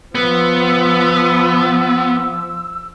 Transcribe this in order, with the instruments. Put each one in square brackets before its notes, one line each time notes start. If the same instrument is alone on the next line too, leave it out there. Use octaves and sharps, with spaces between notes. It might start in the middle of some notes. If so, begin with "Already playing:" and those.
[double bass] F3 [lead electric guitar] B3 [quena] E6